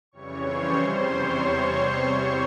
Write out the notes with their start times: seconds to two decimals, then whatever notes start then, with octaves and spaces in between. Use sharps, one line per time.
0.12 F2 C#3 E3 G3 C#5 C#6
0.43 C5 C6
0.74 E2 C3 G3
1.05 C#5 C#6